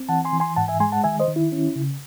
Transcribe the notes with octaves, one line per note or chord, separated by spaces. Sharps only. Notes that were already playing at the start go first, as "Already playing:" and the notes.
Already playing: C4
E3 F#5 A5
G#5 C6
E3
G#5 C6
G#2 F#5 A5
E5 G#5
G#3 G#5 C6
F#5 A5
D#3 E5 G#5
C5 D#5
D#3
E4
C#4
C#3